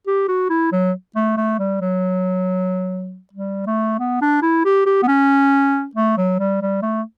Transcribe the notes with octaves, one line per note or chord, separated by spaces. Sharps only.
G4
F#4
E4
F#3
A3
A3
G3
F#3
G3
A3
B3
D4
E4
G4
G4
B3
C#4
A3
F#3
G3
G3
A3